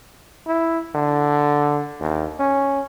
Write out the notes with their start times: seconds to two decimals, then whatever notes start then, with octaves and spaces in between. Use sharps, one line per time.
0.47 E4
0.95 D3
2.00 D#2
2.39 C#4